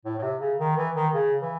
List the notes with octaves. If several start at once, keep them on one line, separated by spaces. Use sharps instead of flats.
A2
A2
C3
C#3
D#3
E3
D#3
C#3
E3